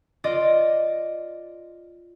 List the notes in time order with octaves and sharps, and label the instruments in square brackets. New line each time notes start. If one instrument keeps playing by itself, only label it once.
[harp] F4 D5 D#5